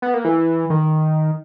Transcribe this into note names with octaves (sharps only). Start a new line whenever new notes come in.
B3
A#3
E3
D#3